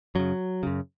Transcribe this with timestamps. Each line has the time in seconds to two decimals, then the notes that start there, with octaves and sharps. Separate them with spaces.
0.15 F#2 C#3 F#3
0.63 F#2 C#3